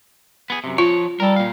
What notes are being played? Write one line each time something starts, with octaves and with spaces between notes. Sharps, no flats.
B3 G#4
F#2 C3
F3 F4 C#5
G3 A4 A#4
A#2 F5